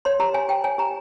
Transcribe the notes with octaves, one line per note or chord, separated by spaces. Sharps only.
C#5 C6
G4 A#5
C#5 G#5
G4 G5
C#5 G#5
G4 A#5